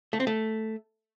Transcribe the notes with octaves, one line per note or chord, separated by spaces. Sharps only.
A3
C4
A3